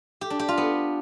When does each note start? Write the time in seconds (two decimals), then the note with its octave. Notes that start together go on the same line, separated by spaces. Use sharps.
0.21 G4
0.30 D4
0.39 G4
0.49 F4
0.58 B3